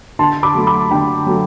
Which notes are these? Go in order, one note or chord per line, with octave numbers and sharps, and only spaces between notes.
D3 A5 C6
B5 D6
F#3 A3
B5 D6
D3 G5 B5
F#3 A3